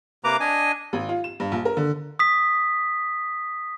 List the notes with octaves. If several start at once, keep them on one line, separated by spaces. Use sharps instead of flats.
C3 A#3 B4 A#5 D6
D4 D#5 G#5
G#1
F4
E7
G2
A#1
A#4
D3
D#6 B6